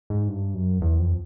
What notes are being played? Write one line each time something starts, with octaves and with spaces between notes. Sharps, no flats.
G#2
G2
F#2
E2
F2